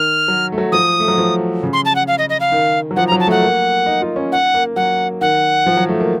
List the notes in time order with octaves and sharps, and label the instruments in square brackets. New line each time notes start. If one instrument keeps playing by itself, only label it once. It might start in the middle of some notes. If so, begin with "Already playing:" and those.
Already playing: [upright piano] D#3 [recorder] F6
[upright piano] F#3
A3
F#3
[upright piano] F3 [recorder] D#6
[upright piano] A3
F#3
F3
C#3
[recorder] C6
A5
F#5
F5
D#5
D#5
F5
[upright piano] D#3
F#3
[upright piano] F3 [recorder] F#5
[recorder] A#5
[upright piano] F#3
[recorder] A5
[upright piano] A3 [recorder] F#5
[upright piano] A#3
D#4
F4
C#4
[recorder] F#5
[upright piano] A#3
[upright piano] F#3 [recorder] F#5
[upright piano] D#3 [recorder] F#5
[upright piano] F3
F#3
A3
A#3